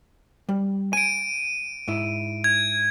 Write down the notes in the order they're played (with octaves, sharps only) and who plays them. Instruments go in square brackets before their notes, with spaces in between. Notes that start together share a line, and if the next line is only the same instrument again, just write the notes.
[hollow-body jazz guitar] G3
[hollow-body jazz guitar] G#5 [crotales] D7 D#7
[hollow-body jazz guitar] G#2 E4
[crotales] G#6